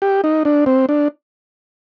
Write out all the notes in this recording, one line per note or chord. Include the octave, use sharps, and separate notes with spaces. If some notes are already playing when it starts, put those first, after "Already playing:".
G4
D#4
D4
C4
D4